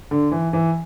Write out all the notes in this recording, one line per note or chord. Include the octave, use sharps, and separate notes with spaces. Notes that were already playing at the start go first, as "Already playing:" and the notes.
D3
E3
E3